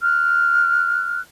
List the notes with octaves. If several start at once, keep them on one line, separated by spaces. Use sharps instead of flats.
F6 F#6